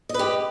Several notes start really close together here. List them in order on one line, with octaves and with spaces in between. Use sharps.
D#5 B4 G4